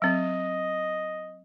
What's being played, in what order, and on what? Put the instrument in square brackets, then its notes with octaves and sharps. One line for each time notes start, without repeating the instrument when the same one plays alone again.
[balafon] F#3 C4 [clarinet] D#5